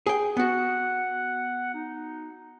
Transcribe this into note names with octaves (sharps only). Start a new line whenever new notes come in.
G#4 G5
B3 F#4 F#5
D#4